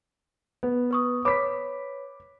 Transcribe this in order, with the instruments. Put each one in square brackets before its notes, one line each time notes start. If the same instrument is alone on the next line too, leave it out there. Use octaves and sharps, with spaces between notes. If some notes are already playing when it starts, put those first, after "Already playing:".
[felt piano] B3
[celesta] B4 C#6 D#6
[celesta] B4 C#5 B5 [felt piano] D6 B6